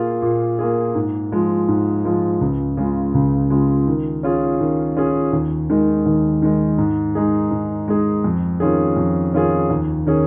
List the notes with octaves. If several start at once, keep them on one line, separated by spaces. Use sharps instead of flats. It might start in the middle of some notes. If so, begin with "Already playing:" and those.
Already playing: A#2 A#3 F4 G#4
A#2
A#3 F4 G#4
G#2
F3 G#3 F4
G#2
F3 G#3 F4
C#2
C#3 G#3 F4
C#2
C#3 G#3 F4
D#3
C#4 F4 G#4
D#3
C#4 F4 G#4
D#2
D#3 G#3 D#4
D#2
D#3 G#3 D#4
G#2
G#3 D#4 G#4
G#2
G#3 D#4 G#4
F2
D#3 C#4 F4 G#4
F2
D#3 C#4 F4 G#4
D#2
D#3 C#4 G#4